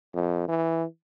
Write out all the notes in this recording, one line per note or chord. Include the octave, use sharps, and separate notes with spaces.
F2
E3